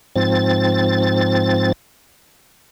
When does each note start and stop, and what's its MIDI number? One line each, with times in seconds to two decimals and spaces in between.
0.16 1.72 44
0.16 1.72 53
0.16 1.72 60
0.16 1.72 93